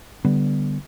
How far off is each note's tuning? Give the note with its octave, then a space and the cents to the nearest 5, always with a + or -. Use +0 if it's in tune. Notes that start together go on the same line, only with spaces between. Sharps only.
D3 -10 G3 +0 B3 +0